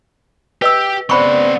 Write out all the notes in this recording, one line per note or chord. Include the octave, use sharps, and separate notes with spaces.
G4 B4 D#5 E6
C#3 B3 C4 C5 D5 F#5 B5 C#6